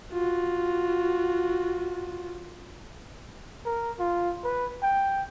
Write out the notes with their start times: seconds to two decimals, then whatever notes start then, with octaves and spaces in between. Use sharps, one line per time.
0.12 F4 F#4
3.65 A#4
3.99 F4
4.44 B4
4.83 G5